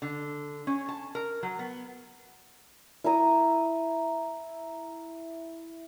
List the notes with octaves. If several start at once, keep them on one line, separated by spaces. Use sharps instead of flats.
D3
C#4
A5
A#4
F#3
B3
E4 E5 A#5 D#6